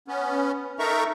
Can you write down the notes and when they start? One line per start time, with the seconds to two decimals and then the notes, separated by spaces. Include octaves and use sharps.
0.08 B3 C#4
0.79 D#4 A4 A#4 E5 A#5 C#6